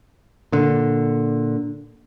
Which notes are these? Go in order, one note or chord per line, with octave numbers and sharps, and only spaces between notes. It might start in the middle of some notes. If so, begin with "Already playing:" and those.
A#2 D3